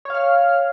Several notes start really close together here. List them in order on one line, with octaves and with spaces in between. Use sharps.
C#5 F5 F6